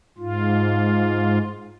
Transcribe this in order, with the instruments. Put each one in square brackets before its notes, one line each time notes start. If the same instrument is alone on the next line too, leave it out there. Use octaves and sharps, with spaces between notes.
[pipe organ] G#2 F4